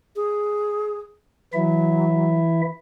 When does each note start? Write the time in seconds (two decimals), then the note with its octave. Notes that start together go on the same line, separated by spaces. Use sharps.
0.16 G#4
1.54 E3 F#3 E4 E5